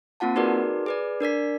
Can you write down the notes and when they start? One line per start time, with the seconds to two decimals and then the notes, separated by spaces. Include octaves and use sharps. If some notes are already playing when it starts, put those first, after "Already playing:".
0.20 A#3 C4 F4 F#5 A5
0.36 D#4 F#4 G#4 A#4 B4 D5
0.86 G#4 B4 D5
1.20 D4 A#4 D5 B6